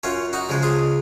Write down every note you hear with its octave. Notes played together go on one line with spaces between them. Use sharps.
F#2 C#4 F4
D#4 F#4
C#3 F3 G#3
F4 G#4